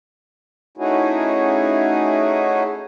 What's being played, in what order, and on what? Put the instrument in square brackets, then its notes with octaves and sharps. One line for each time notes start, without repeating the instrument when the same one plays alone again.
[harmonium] A3 C#4 D#4 E4 F#4 G#4